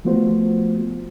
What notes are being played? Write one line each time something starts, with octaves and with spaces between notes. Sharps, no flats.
F3 A3 B3 F4 F#4 C5